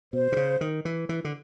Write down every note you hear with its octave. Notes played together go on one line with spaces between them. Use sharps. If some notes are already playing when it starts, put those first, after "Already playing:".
B2 C5
C3
C#3
D#3
E3
E3
D3